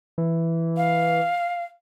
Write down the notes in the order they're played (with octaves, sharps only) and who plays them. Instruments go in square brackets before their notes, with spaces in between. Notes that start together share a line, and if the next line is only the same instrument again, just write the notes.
[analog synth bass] E3
[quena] F5